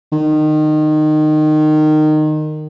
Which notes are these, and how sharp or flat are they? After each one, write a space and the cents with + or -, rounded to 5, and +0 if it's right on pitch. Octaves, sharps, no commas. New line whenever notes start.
D#3 -20